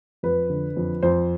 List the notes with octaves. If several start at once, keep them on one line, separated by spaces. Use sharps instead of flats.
F2 B4
D3
F2
F2 C5